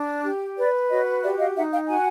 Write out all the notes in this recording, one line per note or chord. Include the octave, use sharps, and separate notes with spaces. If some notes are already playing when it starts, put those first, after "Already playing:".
Already playing: D4
G4
B4 D5
F#4 C#5 D#5
G4 D5 E5
D#5 F5
D#4 E5 F#5
F5 G5
F#4 F#5 G#5